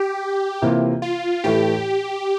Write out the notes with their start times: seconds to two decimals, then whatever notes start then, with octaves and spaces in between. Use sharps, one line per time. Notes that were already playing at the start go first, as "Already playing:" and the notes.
Already playing: G4
0.62 C3 E3 A#3 F4
1.02 F4
1.44 A2 E3 A3 G4